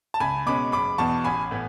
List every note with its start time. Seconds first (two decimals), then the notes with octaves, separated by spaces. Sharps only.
0.14 A5
0.20 C#2 G#5 B5
0.46 B2 G#3 C#4 B5 D6
0.72 F#1 B5 D6
0.98 E2 B2 A5 C#6
1.24 A1 G#5 B5
1.51 A2 E3 B3